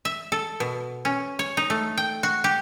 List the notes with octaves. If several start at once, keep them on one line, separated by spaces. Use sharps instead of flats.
E5
A4
B2
C#4
C#5
D#4
A3
G5
F#4
G4